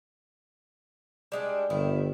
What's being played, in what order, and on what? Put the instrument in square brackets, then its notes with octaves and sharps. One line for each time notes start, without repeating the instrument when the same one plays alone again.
[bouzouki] G3 G#3 D4
[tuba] G1 [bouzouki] D#3 E4